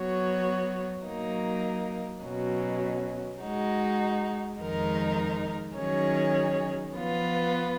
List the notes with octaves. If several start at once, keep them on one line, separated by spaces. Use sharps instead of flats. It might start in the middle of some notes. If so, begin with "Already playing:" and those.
Already playing: F#3 B3 F#4 C#5
F#3 A#3 D#4
B2 F#3 C#4
G#3 D#4 F#4
F2 D#3 G#3 D#4 A#4
D#3 F#3 C#4 G#4 C#5
F3 B3 F4 B4